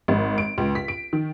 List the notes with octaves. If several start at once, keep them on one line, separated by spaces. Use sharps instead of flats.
G#1
D7
C#2
B6
D7
D#3